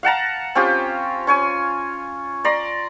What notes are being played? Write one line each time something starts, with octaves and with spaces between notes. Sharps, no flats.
F5 F#5 A5 A#5
C4 C#4 F4 G4
C#4 C#5 G#5
D5 A#5 C6